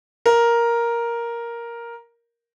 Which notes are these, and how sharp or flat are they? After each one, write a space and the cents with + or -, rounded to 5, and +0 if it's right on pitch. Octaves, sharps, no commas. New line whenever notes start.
A#4 +5